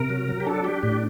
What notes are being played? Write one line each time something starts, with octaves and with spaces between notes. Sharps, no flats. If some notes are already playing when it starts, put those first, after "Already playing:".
Already playing: C3 A#4
F#3
F#3
G4
D4 A4
D4 G4
A2 G4